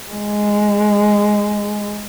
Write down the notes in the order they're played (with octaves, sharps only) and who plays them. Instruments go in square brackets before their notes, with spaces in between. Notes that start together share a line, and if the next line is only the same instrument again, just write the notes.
[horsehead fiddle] G#3